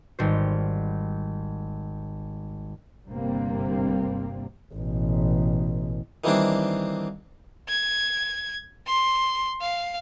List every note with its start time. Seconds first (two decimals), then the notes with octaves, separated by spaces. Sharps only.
0.19 G#1 G3 C5
3.06 G1 G2 C3 G3 A#3 C4
4.74 A1 B2
6.24 D#3 E3 G3 A#3 C4 D4
7.69 G#6
8.87 C6
9.61 F5